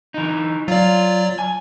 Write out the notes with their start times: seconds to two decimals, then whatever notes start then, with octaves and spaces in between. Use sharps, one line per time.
0.14 E3 D#4
0.68 F#3 F4 D5
1.39 G#5